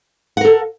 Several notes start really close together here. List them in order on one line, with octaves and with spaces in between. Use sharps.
F#5 A#4 A4